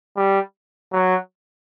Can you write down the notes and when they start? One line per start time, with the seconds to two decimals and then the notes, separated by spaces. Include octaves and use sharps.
0.17 G3
0.93 F#3